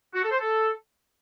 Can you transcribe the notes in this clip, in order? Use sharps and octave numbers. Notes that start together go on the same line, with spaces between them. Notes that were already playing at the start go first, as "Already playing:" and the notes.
F#4
A4
C5
A4